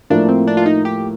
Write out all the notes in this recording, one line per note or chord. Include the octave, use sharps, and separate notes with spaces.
A2 F3 A#3 D4
C4
D4
F4
D#4
G4